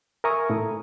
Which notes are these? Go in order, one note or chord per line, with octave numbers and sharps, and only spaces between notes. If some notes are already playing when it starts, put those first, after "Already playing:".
A#4 E5 G#5 A#5 C#6 D#6
A2 A3 E4